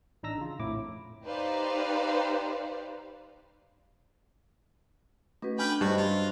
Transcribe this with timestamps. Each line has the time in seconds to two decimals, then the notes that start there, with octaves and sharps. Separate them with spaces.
0.23 A1 D4 D#4 A#5 E6 A#6
0.38 C#3 F4
0.59 A#1 F2 A2 E4 D6
1.26 D#4 G4 B4 C5 D5 F5
5.42 A3 C#4 F#4 B4
5.59 D4 B4 G5 G#5 B5 F6
5.81 G2 F#4 C5 D#5 F#6
5.97 F4